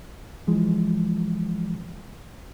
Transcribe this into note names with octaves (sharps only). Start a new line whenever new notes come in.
E3 F3 G#3